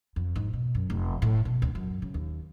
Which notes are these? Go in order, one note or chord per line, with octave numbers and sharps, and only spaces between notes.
F2
G#2
B2
F#2
F1
A2
B2
D2
F#2
C#3
D#2